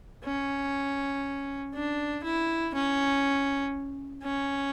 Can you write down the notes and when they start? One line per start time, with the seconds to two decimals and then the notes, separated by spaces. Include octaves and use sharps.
0.24 C#4
1.75 D4
2.24 E4
2.74 C#4
4.23 C#4